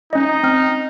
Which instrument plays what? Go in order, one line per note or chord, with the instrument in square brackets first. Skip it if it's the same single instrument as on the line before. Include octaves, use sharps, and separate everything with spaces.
[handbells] C#4 D#5 [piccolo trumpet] D#4
[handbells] C4 F6